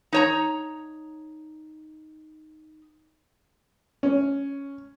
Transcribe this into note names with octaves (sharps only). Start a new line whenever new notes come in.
D#4 C#5 A#5
C#4